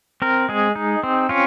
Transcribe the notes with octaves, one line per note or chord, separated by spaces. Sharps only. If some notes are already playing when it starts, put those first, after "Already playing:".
C4 A#4
G#3 G#4
D#4
C4
C#4 F4